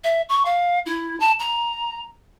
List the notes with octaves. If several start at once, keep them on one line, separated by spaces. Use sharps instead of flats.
E5
C#6
F5
E4
A5
A#5